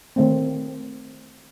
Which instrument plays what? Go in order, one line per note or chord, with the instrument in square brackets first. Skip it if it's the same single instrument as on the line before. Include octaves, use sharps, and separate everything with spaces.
[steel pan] D#3 A3 C4